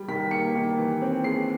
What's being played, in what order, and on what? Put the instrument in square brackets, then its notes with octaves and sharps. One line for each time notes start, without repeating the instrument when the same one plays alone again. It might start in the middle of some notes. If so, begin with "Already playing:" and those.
Already playing: [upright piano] G3
D#3 B6
A#3 C#7
D#3
E3
C4
G#3 C7